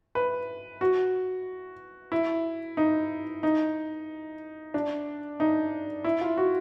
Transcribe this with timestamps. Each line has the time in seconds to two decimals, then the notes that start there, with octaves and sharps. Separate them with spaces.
0.15 B4
0.81 F#4
2.12 E4
2.77 D#4
3.43 D#4
4.74 D4
5.40 D#4
6.04 E4
6.21 F4
6.37 F#4